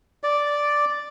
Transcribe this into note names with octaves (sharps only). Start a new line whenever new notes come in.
D5